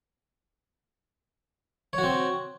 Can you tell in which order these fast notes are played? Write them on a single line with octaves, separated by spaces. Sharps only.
C#5 F#4 C4